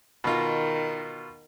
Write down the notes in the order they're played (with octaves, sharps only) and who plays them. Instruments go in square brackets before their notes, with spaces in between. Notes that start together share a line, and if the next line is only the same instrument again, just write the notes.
[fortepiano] B2 F4 [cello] D#3